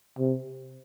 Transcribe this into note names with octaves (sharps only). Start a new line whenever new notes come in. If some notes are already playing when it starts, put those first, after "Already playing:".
C3